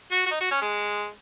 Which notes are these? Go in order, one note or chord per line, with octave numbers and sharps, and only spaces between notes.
F#4
F#4
D#4
F#4
C#4
G#3